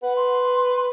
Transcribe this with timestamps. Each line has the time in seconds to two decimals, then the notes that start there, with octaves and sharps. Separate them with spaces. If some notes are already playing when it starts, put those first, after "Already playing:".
0.03 B4 F#5
0.17 C6